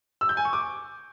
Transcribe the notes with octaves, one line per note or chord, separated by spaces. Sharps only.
E6
G6
G#5
C#6
D6